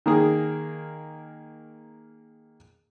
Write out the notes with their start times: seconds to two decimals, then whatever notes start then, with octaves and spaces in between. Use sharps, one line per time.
0.06 D#3 A#3 G#4